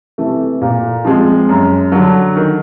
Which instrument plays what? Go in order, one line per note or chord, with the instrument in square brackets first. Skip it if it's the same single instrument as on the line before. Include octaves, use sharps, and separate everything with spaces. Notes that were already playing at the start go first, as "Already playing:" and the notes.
[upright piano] C3 E3 A3
A#2
F3 G#3 C4
F#2
D3 F#3
D#3